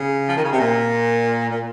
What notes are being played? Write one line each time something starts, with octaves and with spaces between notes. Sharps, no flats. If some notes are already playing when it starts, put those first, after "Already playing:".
Already playing: C#3
F3
D#3
C#3
C3
A#2
A#2